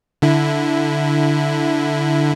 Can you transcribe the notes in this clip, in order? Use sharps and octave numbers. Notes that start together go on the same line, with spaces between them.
D3 E4